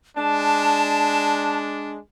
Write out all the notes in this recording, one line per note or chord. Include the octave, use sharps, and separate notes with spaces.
G#3 D4 A5